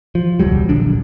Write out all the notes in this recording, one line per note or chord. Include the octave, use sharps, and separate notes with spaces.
F3
E1 C#2 F#3 G3
D1 A#1 D3 D4